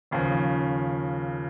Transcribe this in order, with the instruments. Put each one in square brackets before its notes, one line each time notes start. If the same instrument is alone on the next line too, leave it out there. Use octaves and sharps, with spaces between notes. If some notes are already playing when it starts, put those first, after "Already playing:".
[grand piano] D#2 C#3 F3